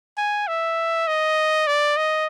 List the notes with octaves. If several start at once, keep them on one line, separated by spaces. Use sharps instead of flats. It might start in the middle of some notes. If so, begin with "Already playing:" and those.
G#5
E5
D#5
D5
D#5